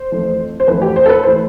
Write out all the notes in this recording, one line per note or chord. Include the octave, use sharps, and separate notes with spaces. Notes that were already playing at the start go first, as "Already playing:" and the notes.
Already playing: C5
F2 E3 A3
C5
F2 E3 A3 B4
G4
C5
A4
B4
E3 A3 C5